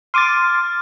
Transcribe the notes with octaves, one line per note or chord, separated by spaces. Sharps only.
C6 D6 F6 A6 D#7